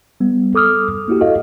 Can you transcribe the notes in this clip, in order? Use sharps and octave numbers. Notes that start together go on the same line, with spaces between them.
G3 B3
A4 D6 D#6 F6
A#3 E4 F#4 G4
F#4 A4 D#5 F5